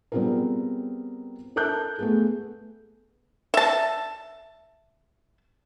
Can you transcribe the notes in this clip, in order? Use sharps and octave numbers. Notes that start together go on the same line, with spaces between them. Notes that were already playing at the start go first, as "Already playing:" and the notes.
G3 B3 C4 F4 G#4 A#4
A4 A#4 A5 F#6 G6
A3 B3 G#4
E5 A5